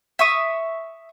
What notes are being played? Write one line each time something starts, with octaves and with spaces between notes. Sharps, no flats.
E5 C#6 D#6